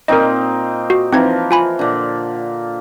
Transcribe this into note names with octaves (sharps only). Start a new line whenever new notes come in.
A#2 C4 D#4 A#4 D#5
F#4
E3 F3 C4 D#4 A#4 G#6
F4 G#5 B5
A#2 D3